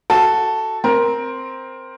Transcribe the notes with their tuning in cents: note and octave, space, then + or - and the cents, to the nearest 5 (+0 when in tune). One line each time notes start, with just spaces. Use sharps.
F#4 +5 A4 +0
C4 +0 A#4 +15